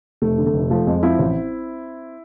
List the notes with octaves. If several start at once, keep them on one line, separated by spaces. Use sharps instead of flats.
F1 A3
D3
A3
F1
F3 A3
F2 G#3
F3 C4 E4
A1